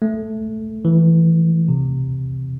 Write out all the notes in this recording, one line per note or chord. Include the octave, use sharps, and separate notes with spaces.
A3
E3
C3